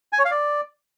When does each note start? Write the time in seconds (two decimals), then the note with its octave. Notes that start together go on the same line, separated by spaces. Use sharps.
0.13 G#5
0.19 C#5
0.25 F5
0.31 D5